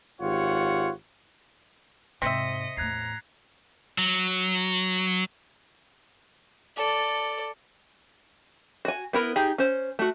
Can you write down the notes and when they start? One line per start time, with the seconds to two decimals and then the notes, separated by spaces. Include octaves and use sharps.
0.21 G#1 F4 G4 C#5 F#5
2.22 G#2 C3 C4 C5 D#5 E5 B6 C#7
2.77 E2 A2 A#5 F#6 G#6 C7
3.98 F#3
6.77 A4 D5
8.85 F#4 G#5
9.13 B3 E4 A#4
9.36 D#4 G4 G#4
9.58 C#4 C5
9.99 A3 F#4